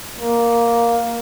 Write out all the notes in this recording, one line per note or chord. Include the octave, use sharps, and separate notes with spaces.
A#3